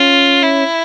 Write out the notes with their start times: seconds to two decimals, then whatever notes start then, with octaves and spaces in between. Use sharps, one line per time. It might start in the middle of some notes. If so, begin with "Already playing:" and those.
Already playing: C#4 F4
0.43 E4